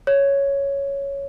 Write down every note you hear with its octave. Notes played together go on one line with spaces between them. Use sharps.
C#5